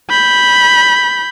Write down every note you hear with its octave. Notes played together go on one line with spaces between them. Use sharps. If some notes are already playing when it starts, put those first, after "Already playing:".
B5 G6